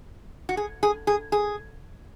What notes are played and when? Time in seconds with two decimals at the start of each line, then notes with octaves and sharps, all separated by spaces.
0.49 F#4
0.57 G#4
0.83 G#4
1.07 G#4
1.32 G#4